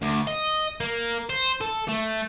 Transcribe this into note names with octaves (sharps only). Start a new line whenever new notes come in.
D2
D#5
A#3
C5
A4
A3